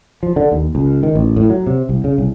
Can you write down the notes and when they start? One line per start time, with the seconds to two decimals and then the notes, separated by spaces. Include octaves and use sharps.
0.23 F3
0.36 D3
0.52 D#2
0.75 C#2
1.03 D#3
1.15 A1
1.36 A2
1.50 F#3
1.67 C3
1.89 C2
2.04 C#3
2.18 C2